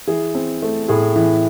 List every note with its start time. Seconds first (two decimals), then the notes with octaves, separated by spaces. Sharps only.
0.07 E3 G#4
0.35 C4
0.62 A3
0.89 A2 G#4
1.16 E3